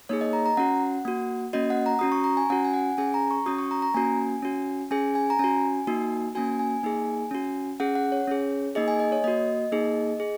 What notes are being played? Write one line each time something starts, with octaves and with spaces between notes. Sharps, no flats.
A#3 D#4 G#4 C#5
D#5
A#5
A#5
C#4 F#4 F#5
A#3 F#4
A#3 C#4 F#4 D#5
F#5
A#5
C#4 F#4 D#6
C#6
A#5
G#5
C#4 F#4 F#5
G#5
F#5
C#4 G#4 G#5
A#5
C#6
C#4 F#4 D#6
C#6
A#5
A#5
A#3 C#4 F#4 G#5
C#4 F#4
C#4 G#4 G#5
G#5
A#5
C#4 F#4 G#5
A#3 D#4 F#4
A#3 C#4 F#4 G#5
G#5
A#3 D#4 G#4
C#4 F#4
C#4 G#4 F#5
F#5
C#5
C#4 G#4
A#3 D#4 G#4 D#5
G#5
D#5
C#5
A#3 F#4 D#5
A#3 D#4 G#4
G#4